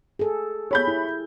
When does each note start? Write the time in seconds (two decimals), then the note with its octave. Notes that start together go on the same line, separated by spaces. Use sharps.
0.19 G#4 A4
0.71 G4 G#4 C#5 B5 G6
0.88 E4